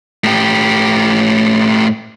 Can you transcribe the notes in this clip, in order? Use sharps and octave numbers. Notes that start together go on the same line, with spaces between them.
A2 G4